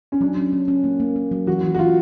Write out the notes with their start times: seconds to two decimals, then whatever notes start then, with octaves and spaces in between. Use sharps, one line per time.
0.12 C#4
0.21 F#3 D4
0.37 C#4
0.53 C#4
0.68 C#4
0.84 A#3
1.00 A#3
1.16 A#3
1.31 F#3
1.47 E3 F#4
1.63 E3
1.75 F#4
1.78 E3 F4